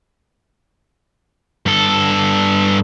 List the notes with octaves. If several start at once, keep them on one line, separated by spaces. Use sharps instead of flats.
G2 A4